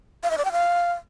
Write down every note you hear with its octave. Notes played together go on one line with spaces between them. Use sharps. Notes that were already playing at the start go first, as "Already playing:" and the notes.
F5
E5
D5
G5
F5